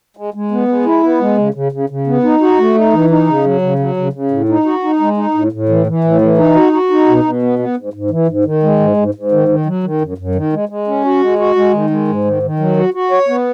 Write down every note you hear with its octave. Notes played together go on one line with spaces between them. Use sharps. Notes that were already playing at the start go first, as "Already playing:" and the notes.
G#3
G#3
B3
G#3
E4
B3
G#3
C#3
C#3
C#3
C#3
B3
D#4
F#4
A3
D#4
E3
D#4
C#3
F#3
C#3
F#3
C#3
C#3
A2
D#4
F#4
D#4
G#3
D#4
A2
A2
E3
E3
A2
E3
D#4
F#4
F#4
D#4
B2
B2
B3
B3
G#2
G#2
E3
G#2
D#3
G#3
G#2
G#2
G#2
D#3
D#3
F#3
D#3
F#2
F#2
D#3
G#3
G#3
C#4
F#4
G#3
F#4
G#3
D#3
G#3
G#2
D#3
D#3
F#3
F#4
F#4
C#5
B3